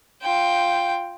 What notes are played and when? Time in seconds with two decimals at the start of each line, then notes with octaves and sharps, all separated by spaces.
0.23 F4 G5